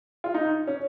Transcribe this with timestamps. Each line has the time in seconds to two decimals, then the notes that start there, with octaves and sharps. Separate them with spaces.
0.24 F4
0.34 D#4
0.67 C#4